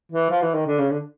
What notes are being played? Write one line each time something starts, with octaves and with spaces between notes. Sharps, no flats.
E3
F3
E3
D#3
D3
C#3
D3